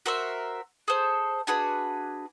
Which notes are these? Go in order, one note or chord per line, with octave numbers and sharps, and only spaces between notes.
F#4 A#4 C5 E5
G#4 A4 C5
D4 F#4 G#4 B4